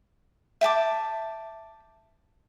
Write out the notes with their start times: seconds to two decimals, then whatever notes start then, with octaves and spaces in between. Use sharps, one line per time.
0.61 E5 G5 A5 D6